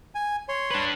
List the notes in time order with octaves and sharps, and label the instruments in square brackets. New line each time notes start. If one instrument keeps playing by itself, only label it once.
[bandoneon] G#5
C#5 C6
[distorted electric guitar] D4 B4